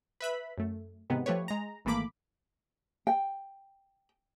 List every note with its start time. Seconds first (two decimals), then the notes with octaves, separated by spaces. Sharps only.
0.21 B4 E5 B5
0.58 F#2 A3
1.10 G#2 C3 D#3 B3
1.26 F3 A3 G4 B4 C#5
1.48 G#3 A#5
1.85 G#1 E3 A3 A#3 B5 D6
3.07 G5